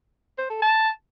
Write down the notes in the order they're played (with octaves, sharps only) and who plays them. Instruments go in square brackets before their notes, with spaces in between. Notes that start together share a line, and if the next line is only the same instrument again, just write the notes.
[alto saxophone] C5
A4
A5